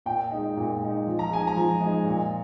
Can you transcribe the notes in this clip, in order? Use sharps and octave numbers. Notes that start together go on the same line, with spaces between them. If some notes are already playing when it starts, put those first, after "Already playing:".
A#2 G5
G#3 D#4
A#2
G#3 D#4
F3
A#5
G#3 D#4 G#5
A#5
F3
G#3 D#4
A#2